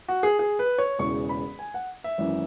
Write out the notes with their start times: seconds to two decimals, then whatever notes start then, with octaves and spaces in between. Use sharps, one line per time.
0.08 F#4
0.23 G#4
0.39 G#4
0.59 B4
0.78 C#5
0.99 E1 E2 C#3 E3 C#6
1.29 B5
1.59 G#5
1.74 F#5
2.04 E5
2.18 G#1 F#2 E3